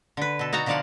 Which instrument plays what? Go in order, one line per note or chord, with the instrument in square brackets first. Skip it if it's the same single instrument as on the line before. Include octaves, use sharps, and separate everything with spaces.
[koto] D3 B4
B2 A4
D#4 F#4 A5 A#5
B2 D3 F3 D5 F5 F#5